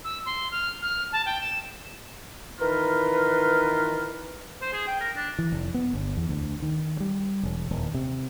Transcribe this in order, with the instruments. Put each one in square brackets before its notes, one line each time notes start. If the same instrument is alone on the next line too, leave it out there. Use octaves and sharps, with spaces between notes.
[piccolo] E6
C6
F6
F6
A5
G5
E7
[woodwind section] D#3 E3 D#4 F4 A#4 B4
[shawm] C5
G#4
G5
A#4
D4
[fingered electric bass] E3
F1
B3
G1
E2
D2
D#3
G3
E1
D#1
C3